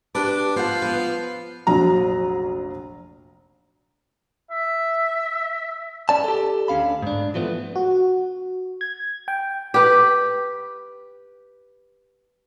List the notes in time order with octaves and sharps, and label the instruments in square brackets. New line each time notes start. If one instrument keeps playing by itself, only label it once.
[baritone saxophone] D4 [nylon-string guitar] G4 B4
[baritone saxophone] F3 [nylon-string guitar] B3 F#5
[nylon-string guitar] B3 B4
[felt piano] F1 A#1 F#3 A#5
[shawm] E5
[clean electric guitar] C#4 D5 A5
G4 A4
D2 D3 C#4 F5 B5
G#2 D4
E3 F3 A3 B3
[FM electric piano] F#4
G#6
G5
[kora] G4 B4